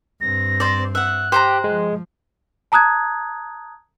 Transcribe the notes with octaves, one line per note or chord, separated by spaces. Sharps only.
G2 C4 A#6
C5 D5
E5 F#5 F#6
G4 C5 G5 A#5
F3 G#3
A5 A#5 D#6 F#6 G#6